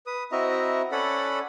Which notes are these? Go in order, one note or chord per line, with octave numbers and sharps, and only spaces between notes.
B4 D#6
C4 E4 F#4 D#5 E5 A#5
C#4 A4 D5 F#5 B5